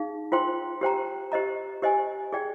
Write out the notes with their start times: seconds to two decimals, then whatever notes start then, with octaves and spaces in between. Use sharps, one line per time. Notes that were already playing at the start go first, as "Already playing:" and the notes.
Already playing: D#4 G#4 F5
0.32 F4 C5 G5 C6
0.81 G4 C5 G5 A#5
1.32 G4 C5 D#5 A#5
1.82 G4 C5 D#5 G#5
2.32 G#4 D5 G5